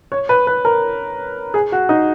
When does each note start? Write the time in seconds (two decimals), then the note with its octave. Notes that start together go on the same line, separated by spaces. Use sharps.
0.12 C#5
0.29 B4
0.47 B4
0.65 A#4
1.54 G#4
1.72 F#4
1.89 D#4